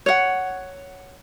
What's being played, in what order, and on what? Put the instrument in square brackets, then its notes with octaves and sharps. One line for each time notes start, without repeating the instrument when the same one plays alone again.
[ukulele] C#5 F#5